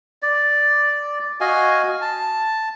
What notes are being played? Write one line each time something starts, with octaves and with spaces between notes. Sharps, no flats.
D5
F#4 D#5 F5 G#5
A5